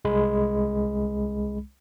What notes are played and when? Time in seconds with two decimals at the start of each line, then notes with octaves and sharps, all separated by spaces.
0.05 C2 G#3 B5